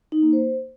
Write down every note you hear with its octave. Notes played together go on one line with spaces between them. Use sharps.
D#4
A#3
C5